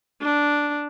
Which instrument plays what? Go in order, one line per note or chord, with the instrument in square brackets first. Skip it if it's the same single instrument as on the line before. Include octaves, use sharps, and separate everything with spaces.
[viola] D4